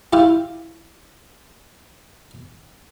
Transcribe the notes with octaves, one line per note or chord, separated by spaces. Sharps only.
E4 F4 G4